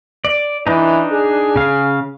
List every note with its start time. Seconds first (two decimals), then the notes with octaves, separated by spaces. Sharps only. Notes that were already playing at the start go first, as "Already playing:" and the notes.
0.25 D5
0.67 E3 D4 D#4
1.12 G#4
1.56 C#3 F5